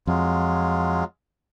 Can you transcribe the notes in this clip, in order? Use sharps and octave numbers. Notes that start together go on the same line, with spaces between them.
F2 F#3 G#3 F4